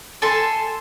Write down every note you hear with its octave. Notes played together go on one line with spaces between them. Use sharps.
A4 G#5 A5 C6